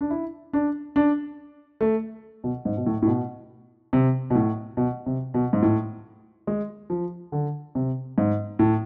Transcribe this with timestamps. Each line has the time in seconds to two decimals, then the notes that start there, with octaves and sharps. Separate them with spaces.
0.01 D4
0.10 E4
0.53 D4
0.96 D4
1.81 A3
2.44 B2
2.65 G#2
2.77 B2
2.86 A2
3.02 A2
3.07 B2
3.93 C3
4.30 B2
4.35 A2
4.77 B2
5.06 C3
5.34 B2
5.53 G#2
5.62 A2
6.47 G#3
6.90 F3
7.32 D3
7.75 C3
8.18 G#2
8.59 A2